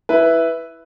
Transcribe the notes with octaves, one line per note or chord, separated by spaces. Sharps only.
E4 B4